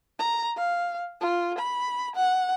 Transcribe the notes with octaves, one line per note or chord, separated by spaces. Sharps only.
A#5
F5
F4
B5
F#5